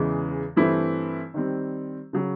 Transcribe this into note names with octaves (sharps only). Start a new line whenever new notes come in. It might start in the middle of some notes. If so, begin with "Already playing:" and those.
Already playing: E2 C#3 E3 G#3
G2 E3 A3 C4 E4
D#3 G3 C4
C#3 F#3